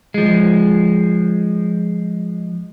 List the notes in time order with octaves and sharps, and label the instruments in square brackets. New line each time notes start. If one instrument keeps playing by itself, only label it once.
[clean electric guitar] F3 G#3